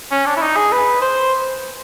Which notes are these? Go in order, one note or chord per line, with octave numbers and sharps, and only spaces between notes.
C#4
D4
E4
D#4
G#4
B4
C5